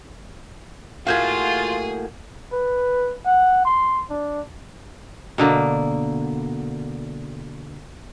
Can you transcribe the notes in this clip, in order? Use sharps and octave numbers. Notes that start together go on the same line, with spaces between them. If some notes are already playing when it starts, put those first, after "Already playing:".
A2 A#3 F4 F#4 G#4 F5 G6 G#6
B4
F#5
C6
D4
B2 D3 A#3